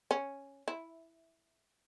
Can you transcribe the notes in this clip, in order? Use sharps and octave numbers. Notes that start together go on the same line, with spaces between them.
C#4
E4